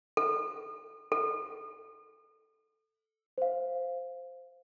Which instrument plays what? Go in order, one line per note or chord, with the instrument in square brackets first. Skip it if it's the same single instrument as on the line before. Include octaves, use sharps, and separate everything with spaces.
[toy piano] A4
A4
[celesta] C5 F5